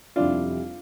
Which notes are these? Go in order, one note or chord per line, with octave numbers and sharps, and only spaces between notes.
F2 C3 G3 C4 D4 E4 F4